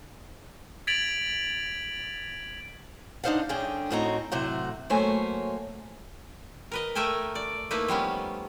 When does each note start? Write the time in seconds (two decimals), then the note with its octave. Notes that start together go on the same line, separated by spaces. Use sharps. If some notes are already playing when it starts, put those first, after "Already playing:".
0.87 G#6 A6 B6 D7 F7 F#7
3.24 D4 D#4 A#4 C5 F5 F#5
3.49 G2 D3 C#4 G#4 G5
3.91 A2 D#3 C4 F#4 D#5 A#5
4.32 A2 C3 F#3 A3 C5 F#5
4.90 F#3 A3 A#3 C5 C#5 G#5
6.71 A#4 B4 D#5
6.95 A3 A4 A#4 E5 G5 G#5
7.35 D5
7.71 A3 A#3 D#4 E4 B4
7.88 F3 G3 B3 C#4